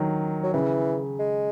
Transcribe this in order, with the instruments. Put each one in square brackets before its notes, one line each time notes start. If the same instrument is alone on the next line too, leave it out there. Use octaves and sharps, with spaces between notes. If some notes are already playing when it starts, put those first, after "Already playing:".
Already playing: [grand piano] D#3 F#3
[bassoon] F#3
[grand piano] C#3 [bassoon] E3
[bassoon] G#3